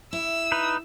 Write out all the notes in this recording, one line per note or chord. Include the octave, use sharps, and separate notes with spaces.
E4 E6
D#4 B4